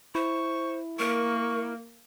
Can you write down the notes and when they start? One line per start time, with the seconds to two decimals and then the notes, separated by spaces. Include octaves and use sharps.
0.15 E4 C5 C#6
0.99 A#3 A#4 C#6